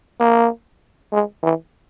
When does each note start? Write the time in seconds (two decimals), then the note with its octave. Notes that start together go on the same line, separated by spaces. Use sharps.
0.20 A#3
1.13 G#3
1.43 E3